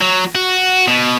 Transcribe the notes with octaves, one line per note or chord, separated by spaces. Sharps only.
F#3
F#4
B2